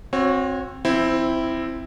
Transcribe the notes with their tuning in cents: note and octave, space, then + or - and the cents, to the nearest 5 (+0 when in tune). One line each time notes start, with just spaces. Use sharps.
C4 +15 F#4 -30 C#5 -5
F3 -30 C4 +0 E4 +0